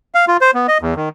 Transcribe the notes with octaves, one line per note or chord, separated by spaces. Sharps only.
F5
F4
C5
B3
D#5
E2
D#3